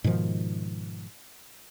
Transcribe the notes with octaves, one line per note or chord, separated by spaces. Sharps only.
G#2 B2 D#3 F3